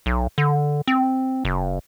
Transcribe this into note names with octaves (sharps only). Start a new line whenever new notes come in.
B1
D3
C4
F#1